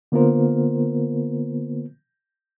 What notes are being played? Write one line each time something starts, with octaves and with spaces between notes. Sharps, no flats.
D3 A#3 B3 F4 A#4 C5